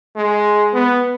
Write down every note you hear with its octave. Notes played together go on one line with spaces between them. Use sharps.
G#3
B3